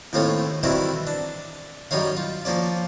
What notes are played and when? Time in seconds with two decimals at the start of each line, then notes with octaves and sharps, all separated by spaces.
0.13 D#2 A2 C4 F4 C#5
0.63 D#3 E3 G3 C4 E4 F#4
1.07 D4
1.91 F#2 G3 D#4 C#5 F5
2.17 F4
2.45 F3 A#3 C#4 D5